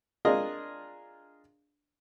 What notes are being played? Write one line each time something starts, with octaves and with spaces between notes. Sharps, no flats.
D4 F4 G#4 A#4 D#5